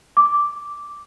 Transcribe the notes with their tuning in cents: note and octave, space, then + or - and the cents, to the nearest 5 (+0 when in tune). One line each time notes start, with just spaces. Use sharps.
D6 -5